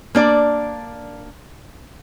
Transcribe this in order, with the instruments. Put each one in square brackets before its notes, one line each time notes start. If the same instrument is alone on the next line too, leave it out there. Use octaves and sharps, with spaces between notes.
[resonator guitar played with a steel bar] A#3 D4 D5